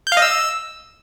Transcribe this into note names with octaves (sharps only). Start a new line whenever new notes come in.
G6
F5
D#5
E6